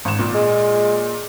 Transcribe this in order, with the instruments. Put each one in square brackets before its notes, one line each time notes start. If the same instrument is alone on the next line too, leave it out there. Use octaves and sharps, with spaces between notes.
[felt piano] G#1 E7
A#2
[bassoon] G#3